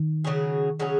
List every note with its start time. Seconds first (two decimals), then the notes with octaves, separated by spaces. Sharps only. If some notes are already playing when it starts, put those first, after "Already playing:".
Already playing: D#3
0.24 C#3 F#3 C#4 G#4
0.79 C#3 F#3 C#4 G#4